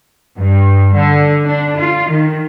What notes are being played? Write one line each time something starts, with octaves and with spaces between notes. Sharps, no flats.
G2
D3
D4
F4
D#3